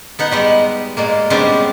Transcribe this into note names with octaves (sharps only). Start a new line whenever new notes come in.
B3 D#4 F#5
G3 G#3 B3
A#2 G#3 A#3
C#3 G3 G#3 B3 C4 D4